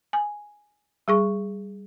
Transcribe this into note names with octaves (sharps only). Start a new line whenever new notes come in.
G#5
G3 G#4 C#6